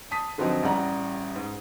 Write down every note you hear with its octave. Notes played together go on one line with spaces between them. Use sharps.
A5 D#6 B6
D3 F3 F#3 C4 D#4
A1 G3 F#5 A#5
G#2